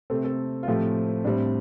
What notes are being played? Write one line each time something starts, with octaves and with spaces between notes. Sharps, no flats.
C3 A3 C4 A4
A4
F4
A2 F3 A3 C4 G4
A2 G3 C4 D4